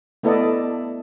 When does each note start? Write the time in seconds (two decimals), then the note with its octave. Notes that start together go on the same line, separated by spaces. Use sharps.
0.23 A3 B3 E4 A4 D5 D#5